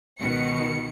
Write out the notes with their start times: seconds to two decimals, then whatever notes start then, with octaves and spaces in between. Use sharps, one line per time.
0.20 C#2 B2 D#3 C#7